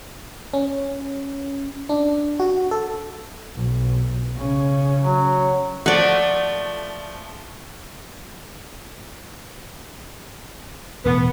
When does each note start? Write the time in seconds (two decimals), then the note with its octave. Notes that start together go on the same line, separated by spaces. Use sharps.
0.54 C#4
1.89 D4
2.40 F#4
2.71 A4
3.56 B1
4.35 C#3 C#4
5.02 F#3
5.86 F3 A3 D5 F#5
11.05 E1 A2 B3